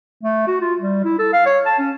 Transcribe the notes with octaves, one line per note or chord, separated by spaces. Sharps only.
A3
F#4
F4
G3
E4
A4
F5
C#5
A5
C#4